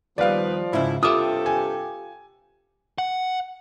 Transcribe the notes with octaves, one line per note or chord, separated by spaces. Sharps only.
D#2 F3 G3 B3 D#4 B4 D5 F5
G#2 C#3 E4
G2 C3 F4 G4 A4 E5 D6 D#6
G#5
F#5